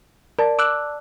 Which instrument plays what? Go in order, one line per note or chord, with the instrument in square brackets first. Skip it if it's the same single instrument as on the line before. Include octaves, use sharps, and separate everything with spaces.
[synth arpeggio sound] A#4 [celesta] D5 A5
[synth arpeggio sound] D6 E6 F#6